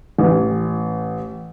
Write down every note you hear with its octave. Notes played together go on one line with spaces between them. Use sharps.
A1